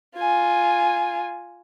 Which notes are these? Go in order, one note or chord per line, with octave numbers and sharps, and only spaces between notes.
F4 G#5